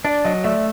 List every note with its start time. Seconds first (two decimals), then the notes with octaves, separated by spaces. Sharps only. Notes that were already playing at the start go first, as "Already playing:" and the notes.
0.04 D4 D5
0.24 F#3 D#5
0.44 A3 D5 E5